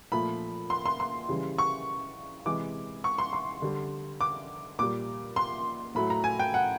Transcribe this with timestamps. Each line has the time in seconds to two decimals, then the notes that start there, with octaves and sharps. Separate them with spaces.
0.12 A#2 F3 A3 B5
0.70 C6
0.86 C6
1.00 C6
1.29 C#3 E3 G3
1.58 C#6
2.46 C3 E3 G#3 D6
3.04 C#6
3.18 C6
3.33 C6
3.62 D3 G3
4.21 D6
4.79 A#2 G3 D6
5.36 C6
5.95 A2 F#3 A3 B5
6.10 A#5
6.24 G#5
6.39 G5
6.54 F#5